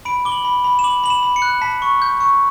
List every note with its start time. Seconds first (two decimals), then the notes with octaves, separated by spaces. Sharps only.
0.05 B5 D7
0.25 D6 G7
0.32 F#7
0.45 B5
0.64 B5
0.79 E7
0.84 D6 F#7
1.04 B5 F#7
1.10 E7
1.23 B5
1.36 C#7
1.42 F#6
1.61 A5 B6
1.82 C#6
2.02 G6
2.21 C#6